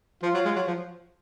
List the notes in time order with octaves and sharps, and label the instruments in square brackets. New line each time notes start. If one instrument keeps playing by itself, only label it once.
[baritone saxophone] F3 [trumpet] F4
[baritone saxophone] F#3
G#3
F#3
F3